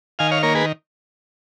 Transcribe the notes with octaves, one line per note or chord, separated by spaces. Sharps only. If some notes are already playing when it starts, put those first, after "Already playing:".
D#3 F5 G#5
C#5 F5
A#3 A#4 C#5
G#4 B4